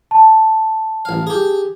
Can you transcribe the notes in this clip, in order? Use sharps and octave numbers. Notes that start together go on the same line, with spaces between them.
A5
A1 F5
G4 G#4